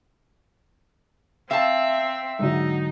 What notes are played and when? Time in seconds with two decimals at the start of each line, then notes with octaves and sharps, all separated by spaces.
1.51 C4 E5 F5 A5
2.39 G#2 D3 F#3 D#4